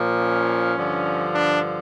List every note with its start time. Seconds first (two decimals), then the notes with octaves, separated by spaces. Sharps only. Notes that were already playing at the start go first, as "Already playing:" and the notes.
Already playing: A#2 F3
0.20 C#4
0.78 G2 D3 F3
1.35 D4